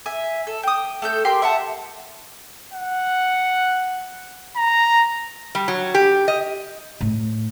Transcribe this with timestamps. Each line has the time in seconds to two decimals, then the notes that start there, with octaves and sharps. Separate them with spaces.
0.06 E5 G#5
0.47 A4
0.63 G5 D#6
1.02 A3 A4 G6
1.25 G4 A#4 G5 C6
1.42 E5 F#5 A5
2.73 F#5
4.56 A#5
5.55 G3
5.68 F#3
5.94 G4
6.28 D#5
7.01 A2